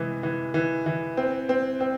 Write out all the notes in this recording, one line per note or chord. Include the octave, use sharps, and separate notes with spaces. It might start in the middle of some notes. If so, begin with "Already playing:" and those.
Already playing: C3 E3 G#3
E3
E3
E3
C4
C4
C4